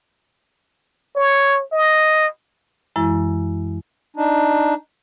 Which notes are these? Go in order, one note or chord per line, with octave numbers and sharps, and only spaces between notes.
C#5
D#5
F#2 E3 G#3 E4
D4 D#4